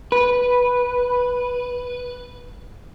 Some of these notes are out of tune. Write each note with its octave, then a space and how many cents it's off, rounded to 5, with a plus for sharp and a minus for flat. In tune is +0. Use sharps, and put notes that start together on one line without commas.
B4 -5